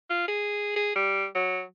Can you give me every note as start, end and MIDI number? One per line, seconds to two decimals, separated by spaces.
0.10 0.27 65
0.28 0.74 68
0.76 0.94 68
0.95 1.26 55
1.35 1.62 54